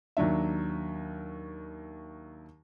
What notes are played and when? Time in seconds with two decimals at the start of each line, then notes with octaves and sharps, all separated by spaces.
0.17 D#2 F#3 D4 E5